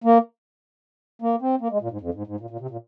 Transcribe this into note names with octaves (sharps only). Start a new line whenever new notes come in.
A#3
A#3
C4
A#3
G#3
A#2
G#2
F2
G#2
G#2
A#2
A#2
C3
A#2